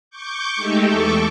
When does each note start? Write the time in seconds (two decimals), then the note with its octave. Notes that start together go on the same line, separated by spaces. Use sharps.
0.10 C#6 D6 G6
0.56 G#3 A3 D#4 G4 A4
0.87 E2 A4 C#6 D6